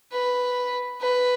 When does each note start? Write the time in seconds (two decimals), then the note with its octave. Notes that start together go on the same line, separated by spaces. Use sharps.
0.13 B4
1.01 B4